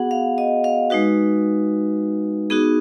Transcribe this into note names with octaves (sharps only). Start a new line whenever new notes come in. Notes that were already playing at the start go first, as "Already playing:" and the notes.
Already playing: B3 F#4 G#4 F#5
F5
D#5
F5
G#3 D#4 F#4 B4
B3 D#4 F#4 G#4